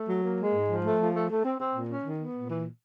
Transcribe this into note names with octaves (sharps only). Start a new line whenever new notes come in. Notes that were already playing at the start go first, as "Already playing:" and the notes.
Already playing: A3
F#3
A#3
G#3
G#2
F3
A3
F3
A3
A3
C4
C4
A#2
C#4
D#3
B3
A#2
E3